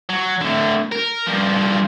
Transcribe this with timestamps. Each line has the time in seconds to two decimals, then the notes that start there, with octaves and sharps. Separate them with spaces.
0.10 F#3
0.41 A2 D3
0.92 A#4
1.27 G2 F3